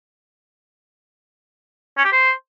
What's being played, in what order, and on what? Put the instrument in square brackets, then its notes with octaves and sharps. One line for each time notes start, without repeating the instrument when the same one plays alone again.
[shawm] C#4
G4
C5